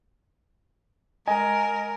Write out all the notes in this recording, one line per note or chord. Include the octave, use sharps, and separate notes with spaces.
G#3 A#4 D#5 G#5